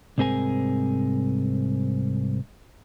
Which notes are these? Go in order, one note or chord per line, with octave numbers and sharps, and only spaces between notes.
C2 G#2 C4 G#4 A#4 G#5